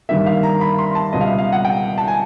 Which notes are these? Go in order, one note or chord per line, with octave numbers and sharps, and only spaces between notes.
G2 D#3 G3 A#3 E5
F5
A#5
B5
C6
A5
C#2 B2 G3 B3 D#5
F5
E5
F5
F#5
G5
A5
G#5